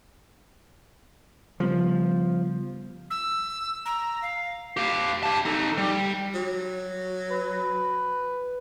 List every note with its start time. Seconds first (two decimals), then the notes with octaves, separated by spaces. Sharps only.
1.60 C#3 F3 G3 B3
3.10 E6
3.85 A#5
4.22 F5
4.77 G4 F5
5.23 G4 A5
5.45 D#4 A4
5.78 G3
6.35 F#3
7.31 B4